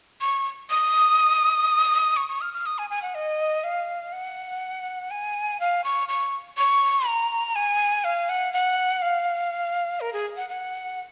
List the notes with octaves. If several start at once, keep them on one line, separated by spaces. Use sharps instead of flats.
C#6
D#6
C#6
C#6
F6
F6
D#6
G#5
G#5
F#5
D#5
F5
F#5
G#5
F5
C#6
C#6
C#6
A#5
G#5
F5
F#5
F#5
F5
A#4
G#4
F#5
F#5